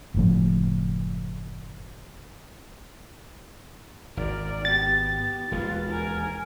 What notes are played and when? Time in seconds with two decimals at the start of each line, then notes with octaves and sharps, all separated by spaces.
0.14 F#1 A2 F3
4.17 G#1 A#4 D5
4.65 B3 G4 A6
5.52 E1 D#2 G#3 F4 B4
5.90 A#4 G#5